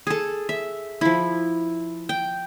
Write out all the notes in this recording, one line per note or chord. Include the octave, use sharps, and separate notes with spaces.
G#4 A4
E5
F3 E4
G5